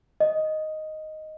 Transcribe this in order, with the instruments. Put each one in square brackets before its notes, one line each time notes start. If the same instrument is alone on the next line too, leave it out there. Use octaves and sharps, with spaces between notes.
[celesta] D#5